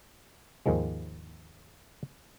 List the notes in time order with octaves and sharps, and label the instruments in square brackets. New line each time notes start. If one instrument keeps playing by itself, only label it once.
[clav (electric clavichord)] D#2 G#2 D#3 F3 G#3